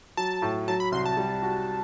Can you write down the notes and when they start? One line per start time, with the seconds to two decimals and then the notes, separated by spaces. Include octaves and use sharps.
0.17 F#3 A5
0.42 A2
0.68 F#3 A5
0.80 B5
0.92 C2 C6
1.06 A5
1.17 G3
1.42 F#4